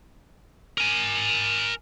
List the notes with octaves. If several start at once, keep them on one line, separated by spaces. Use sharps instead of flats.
A#4 G#5